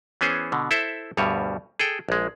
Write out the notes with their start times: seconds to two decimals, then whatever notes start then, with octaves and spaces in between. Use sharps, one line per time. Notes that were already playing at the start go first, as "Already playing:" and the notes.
0.21 E3 B3 C#4 G#4 C5
0.52 B2 D3
0.71 E4 A4 C5 E5
1.17 D2 G2 B2 G3 C#5
1.79 G#4 A4 G5
2.09 A#1 G#3